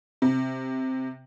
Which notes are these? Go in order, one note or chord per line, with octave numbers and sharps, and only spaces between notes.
C3